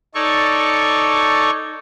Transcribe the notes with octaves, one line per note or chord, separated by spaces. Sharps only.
D#4 A4 C#5 D5 C#6